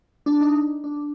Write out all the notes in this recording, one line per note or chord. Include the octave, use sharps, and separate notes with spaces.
D4
D#4
D4